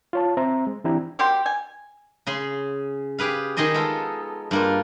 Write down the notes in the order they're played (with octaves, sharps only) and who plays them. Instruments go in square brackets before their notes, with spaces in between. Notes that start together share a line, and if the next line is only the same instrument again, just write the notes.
[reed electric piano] F4 C#5 A5
C4 C5 E5 A#5
G#3
E3 C4 D4 E4 G4 A#5
[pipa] F#3 A#3 G4 C6
G#5
[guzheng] C#3 G#4 C6
G4 G#4 B4 F5
D#3 D#4 G#4 D#5 C6
G#3 B3 F4 A4
G2 A#3 F4